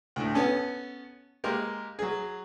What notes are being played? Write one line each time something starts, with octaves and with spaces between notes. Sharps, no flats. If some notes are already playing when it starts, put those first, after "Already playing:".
D2 A2
B3 C#4 A4
G#3 A#3 G4 A#4
F#3 G#4